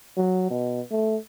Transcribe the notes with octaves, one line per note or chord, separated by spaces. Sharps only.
F#3
B2
A3